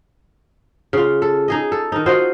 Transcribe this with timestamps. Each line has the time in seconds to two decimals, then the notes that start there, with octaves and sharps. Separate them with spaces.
0.93 C#3 F4
1.22 A4
1.48 D#4 G#4 D#5
1.72 A4
1.92 D#3 D#4
2.06 F4 F#4 C5 D#5